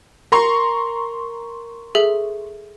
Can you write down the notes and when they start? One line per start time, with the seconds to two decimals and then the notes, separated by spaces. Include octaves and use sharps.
0.32 A#4 A#5 C6 C#6
1.95 G#4 A4 E5